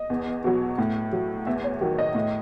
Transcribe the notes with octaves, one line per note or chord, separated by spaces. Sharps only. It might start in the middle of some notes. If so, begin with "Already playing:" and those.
Already playing: D#5
E2
B2 F#3
A2
F#3
E2 E5
C#5
D#3 F#3
D#5
A2